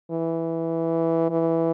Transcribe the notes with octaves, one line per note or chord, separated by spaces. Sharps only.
E3
E3